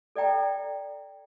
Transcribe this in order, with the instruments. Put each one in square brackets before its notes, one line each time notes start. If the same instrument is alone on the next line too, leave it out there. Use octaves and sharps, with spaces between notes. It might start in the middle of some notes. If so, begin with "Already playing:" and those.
[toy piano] A4 D5 E5 G5 A#5